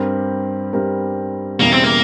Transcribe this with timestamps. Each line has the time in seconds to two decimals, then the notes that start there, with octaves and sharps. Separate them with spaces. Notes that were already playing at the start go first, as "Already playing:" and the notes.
Already playing: G2 G3 C4 G4 A#4
0.73 G2 G3 C4 G4 A#4
1.60 E1 E2 C#3 G3 A#3
1.72 C4
1.84 A#3